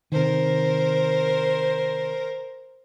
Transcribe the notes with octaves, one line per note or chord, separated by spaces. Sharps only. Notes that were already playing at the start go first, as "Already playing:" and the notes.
C3 D#3 A#4 C5